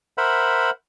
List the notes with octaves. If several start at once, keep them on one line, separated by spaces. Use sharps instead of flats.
A#4 C5 E5 F#5 B5